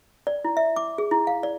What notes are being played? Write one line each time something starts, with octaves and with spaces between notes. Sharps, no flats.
D5
E4
E5
D6
G#4
E4
F5
D5